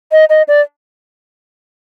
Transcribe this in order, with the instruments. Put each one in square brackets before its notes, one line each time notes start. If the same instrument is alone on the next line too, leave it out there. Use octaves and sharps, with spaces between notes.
[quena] D#5
D#5
D5